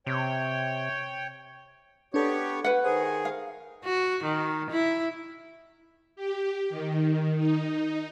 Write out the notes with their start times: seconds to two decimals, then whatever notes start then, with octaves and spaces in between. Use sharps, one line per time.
0.07 C3 C#5 G5
2.14 B3 D4 G4 A4 C#5
2.64 B4 F#5
2.84 D#3 G#4 C5
3.25 F5
3.85 F#4
4.24 D#3
4.70 E4
6.16 G4
6.70 D#3
7.37 D#4